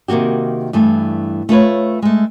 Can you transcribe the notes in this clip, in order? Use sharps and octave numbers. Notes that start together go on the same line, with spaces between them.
C3 D#3 A#3 F#4 G4
G2 E3 A3
A3 F4 B4 C#5
G#3 A3